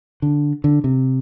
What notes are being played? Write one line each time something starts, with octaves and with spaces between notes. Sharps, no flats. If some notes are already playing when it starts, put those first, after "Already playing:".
D3
D3
C3